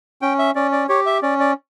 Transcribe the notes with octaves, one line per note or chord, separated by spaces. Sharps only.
C#4 G5
E5
C#4 D5
D5
G4 C#5
E5
C#4 D5
D5